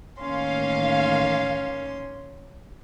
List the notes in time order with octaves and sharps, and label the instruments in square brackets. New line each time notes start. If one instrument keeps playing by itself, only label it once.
[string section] A1 D#3 F5 [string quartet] A#3 C#4 C6